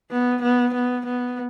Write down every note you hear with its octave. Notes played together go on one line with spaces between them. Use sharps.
B3
B3
B3
B3